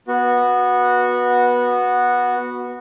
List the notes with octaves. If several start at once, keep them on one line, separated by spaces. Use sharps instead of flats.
B3 F#4